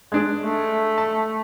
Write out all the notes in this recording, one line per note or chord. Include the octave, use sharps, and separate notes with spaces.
G#3 D4 G#4
A3
A5